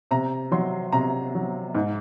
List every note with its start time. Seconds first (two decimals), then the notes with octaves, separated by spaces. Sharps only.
0.11 C3 A#5
0.51 F#3 C6
0.92 C3 A#5
1.35 F#3
1.75 G#2